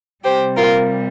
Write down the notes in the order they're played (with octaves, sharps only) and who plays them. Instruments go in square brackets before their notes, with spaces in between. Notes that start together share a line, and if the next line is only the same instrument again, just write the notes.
[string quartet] C3 G3 G4 C5
F4 A#4